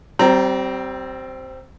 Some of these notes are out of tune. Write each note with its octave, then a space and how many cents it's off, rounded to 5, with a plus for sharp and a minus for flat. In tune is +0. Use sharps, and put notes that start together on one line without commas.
G3 -30 C4 +0 A#5 +0